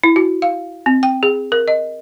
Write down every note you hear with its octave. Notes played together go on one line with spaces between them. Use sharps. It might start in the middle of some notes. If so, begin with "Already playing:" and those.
E4
F#4
F5
C4
G5
G#4
A#4
D#5